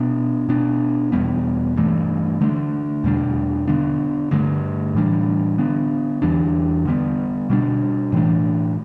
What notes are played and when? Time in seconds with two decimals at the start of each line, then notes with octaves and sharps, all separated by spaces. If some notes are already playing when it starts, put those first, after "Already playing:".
Already playing: B2 B3 D4
0.49 B2 B3 D4
1.12 E2 B2 G3 B3
1.77 G2 E3 A3
2.41 D3 A3 D4
3.04 E2 B2 G3 D4
3.68 D3 B3 D4
4.31 G2 D3 A3
4.95 A2 E3 G3 D4
5.58 D3 B3 D4
6.22 E2 E3 G3 D4
6.86 D3 G3 B3
7.50 B2 G3 D4
8.13 A2 E3 A3 D4